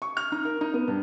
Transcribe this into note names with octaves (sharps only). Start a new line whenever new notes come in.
C#6
F6
D#4
A#4
D#4
B3
G2